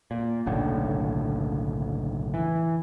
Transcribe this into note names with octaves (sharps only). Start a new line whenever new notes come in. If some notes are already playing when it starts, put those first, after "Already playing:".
A#2
F#1 B1 A2 D3
E3